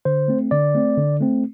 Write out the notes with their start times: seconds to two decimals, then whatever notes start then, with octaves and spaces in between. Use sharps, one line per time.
0.05 D3 C5
0.28 A3 C4
0.51 D3 D5
0.75 A3 C4
0.97 D3
1.21 A3 C4